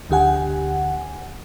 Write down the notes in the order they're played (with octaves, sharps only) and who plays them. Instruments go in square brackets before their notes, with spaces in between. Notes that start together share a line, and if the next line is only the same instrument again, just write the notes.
[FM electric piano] D2 D3 G4 F#5 G#5